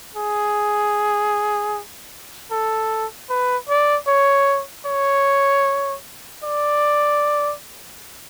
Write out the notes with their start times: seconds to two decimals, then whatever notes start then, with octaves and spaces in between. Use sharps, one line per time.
0.16 G#4
2.52 A4
3.30 B4
3.69 D5
4.08 C#5
4.86 C#5
6.44 D5